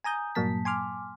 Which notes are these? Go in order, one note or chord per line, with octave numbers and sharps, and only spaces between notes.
G#5 A#5 D#6 G6
G2 A#2 F#3 A#3 A5 B6
G#5 C6 D6 F6